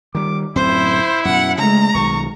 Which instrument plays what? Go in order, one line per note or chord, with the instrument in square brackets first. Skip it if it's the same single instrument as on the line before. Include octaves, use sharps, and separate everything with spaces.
[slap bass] D#3 G3 [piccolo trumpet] D6
[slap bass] D1 F#2 C4 [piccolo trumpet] E4 [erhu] C5
[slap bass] F#2 B2 [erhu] F#5
[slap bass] C#3 A3 [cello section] G#3 [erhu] A#5
[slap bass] B1 D#3 [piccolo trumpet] C#6